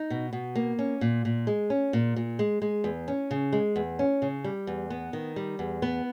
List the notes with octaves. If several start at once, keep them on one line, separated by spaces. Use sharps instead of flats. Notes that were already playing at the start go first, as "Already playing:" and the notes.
Already playing: D#4
B2
B2
A#3
C#4
A#2
A#2
G#3
C#4
A#2
A#2
G#3
G#3
E2
C#4
C#3
G#3
E2
C#4
C#3
G3
E2
B3
D#3
G3
E2
B3